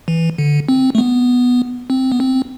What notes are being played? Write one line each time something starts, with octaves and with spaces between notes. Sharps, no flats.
E3
D3
C4
A3
B3
C4
B3
C4